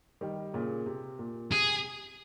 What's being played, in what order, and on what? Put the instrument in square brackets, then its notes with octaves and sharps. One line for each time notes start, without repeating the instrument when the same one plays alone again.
[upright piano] D#3 G3
A#2 C#3
C3
A#2
[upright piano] C3 [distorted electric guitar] G#4